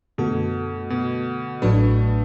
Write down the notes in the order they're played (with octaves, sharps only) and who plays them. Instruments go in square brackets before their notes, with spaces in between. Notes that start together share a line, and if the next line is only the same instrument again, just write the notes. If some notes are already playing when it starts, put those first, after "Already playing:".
[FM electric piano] F#2 D3 A3 F#4 A4 [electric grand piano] B2
[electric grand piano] B2
[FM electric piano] A1 A2 F#3 D4 B4 [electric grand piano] A3